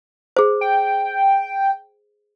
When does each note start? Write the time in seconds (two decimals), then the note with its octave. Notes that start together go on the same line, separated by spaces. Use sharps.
0.37 G#4 C5
0.61 G5